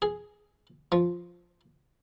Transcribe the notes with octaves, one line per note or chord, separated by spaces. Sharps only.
G#4
F3